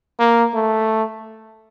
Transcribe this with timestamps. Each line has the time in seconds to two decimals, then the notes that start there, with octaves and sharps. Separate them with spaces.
0.19 A#3
0.54 A3